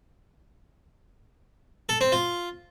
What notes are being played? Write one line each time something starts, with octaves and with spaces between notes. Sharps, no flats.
A4
C4
F4